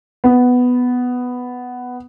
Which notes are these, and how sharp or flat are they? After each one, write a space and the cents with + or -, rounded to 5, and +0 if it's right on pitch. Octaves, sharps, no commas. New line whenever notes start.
B3 +5